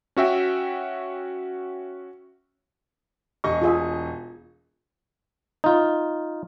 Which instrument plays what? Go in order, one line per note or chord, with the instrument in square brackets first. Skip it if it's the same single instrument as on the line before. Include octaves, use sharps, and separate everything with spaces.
[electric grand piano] C#4 F#4 E5 G5
[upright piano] E1 D#5 C#6
[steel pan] F4 G#4 E5
[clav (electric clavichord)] D#4 F4